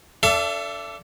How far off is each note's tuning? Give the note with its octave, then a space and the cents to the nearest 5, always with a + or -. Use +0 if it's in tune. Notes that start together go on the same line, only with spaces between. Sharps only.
D4 -10 A4 +5 E5 +35